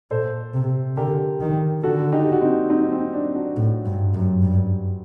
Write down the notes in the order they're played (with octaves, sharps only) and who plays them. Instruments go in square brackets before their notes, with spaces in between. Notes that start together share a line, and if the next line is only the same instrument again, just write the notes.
[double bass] A#2 [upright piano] A4 C5
[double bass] C3
[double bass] D3 [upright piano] G4 A#4
[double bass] D#3
[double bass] D3 [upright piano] F#4 A4
[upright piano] D#4 G4
F#4
C4 D#4
C4 D#4
C4
D4
D4 F#4
[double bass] A2
G2
F#2
G2